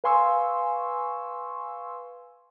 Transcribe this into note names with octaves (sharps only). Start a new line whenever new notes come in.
B4 F5 G#5 C6 C#6 E6